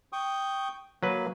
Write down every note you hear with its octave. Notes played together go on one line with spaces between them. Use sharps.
G5 C#6 D#6
F#3 A#3 B4